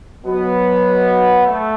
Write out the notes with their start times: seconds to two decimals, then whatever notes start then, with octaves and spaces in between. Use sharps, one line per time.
0.25 B2 F#3 B3
1.46 A3